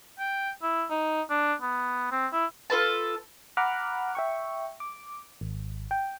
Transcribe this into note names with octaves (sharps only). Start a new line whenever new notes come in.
G5
E4
D#4
D4
B3
C4
E4
F4 A4 B4 A5
F#5 A#5 B5 D6 F6 F#6
E5 G5 C#6
D6
G#1
G5